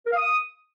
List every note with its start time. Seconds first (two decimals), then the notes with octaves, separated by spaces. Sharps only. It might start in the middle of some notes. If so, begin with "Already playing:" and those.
0.06 A#4
0.11 F5
0.16 D#6